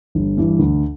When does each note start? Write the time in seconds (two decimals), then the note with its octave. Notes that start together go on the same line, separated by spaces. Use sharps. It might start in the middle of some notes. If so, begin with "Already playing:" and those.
0.15 G1
0.37 G2 E3
0.59 D2